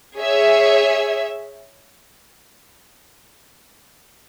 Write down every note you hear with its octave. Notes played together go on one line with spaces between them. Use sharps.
G#4 C#5 E5